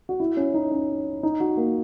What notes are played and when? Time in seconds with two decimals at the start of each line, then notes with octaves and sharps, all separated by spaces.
0.09 F#4
0.20 E4
0.37 C#4
0.54 D#4
0.72 C#4
1.23 D#4
1.40 F#4
1.57 A#3